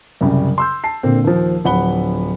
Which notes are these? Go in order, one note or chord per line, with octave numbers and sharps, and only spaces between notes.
C2 F#2 C#3 G3
C6 E6 G6
A5 C7
A#2 D3 C4
D#2 F3
D1 F3 F#5 B5 G7